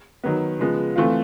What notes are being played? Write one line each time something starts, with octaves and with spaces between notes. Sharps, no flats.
D#3 F#3 B3
C#3 F3 G#3 B3
E3 A3 C4 F4